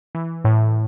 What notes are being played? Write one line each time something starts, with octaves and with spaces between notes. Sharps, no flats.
E3
A2